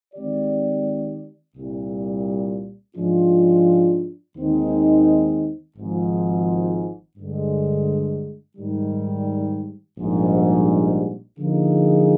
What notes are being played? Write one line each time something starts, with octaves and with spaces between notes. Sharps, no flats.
D#3 G#3 C4 G4 D5
C2 A#2 G3
G#2 F3 G#3 D4 F4
D#2 D#3 G#3 C4 D#4
G#1 G#2 F3
G2 D3 G#3
G#2 D#3 G3
A#1 G#2 G3
D3 F3 A#3 D#4 G#4